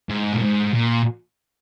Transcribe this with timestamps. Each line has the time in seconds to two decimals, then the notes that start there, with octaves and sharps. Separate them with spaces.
0.09 G#2
0.33 A#2
0.41 G#2
0.74 A#2